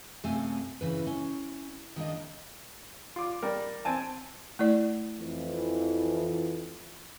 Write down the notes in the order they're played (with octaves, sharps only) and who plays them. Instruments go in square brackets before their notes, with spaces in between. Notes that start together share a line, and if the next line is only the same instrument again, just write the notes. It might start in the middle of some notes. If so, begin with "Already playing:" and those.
[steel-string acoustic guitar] F#2 C3 A3 F5 G#5
C#3 E3 B4
C#4
D#3 A#3 D4 D#5
[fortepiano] F4 D6
G3 A#4
C4 G#5 A5
[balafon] A3 E4 D5
[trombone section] F2 E3